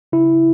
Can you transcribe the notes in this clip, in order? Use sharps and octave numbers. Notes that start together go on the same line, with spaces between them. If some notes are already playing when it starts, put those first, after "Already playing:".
C#3 E4